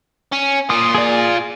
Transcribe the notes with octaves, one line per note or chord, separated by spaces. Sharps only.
C#4
A#2 F4 D#6
G#4 D5